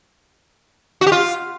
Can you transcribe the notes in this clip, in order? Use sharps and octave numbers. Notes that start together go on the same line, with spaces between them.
F#4
G4
F4